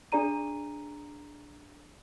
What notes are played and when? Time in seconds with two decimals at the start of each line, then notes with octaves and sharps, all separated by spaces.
0.12 D4 G#4 D5 A#5 D#7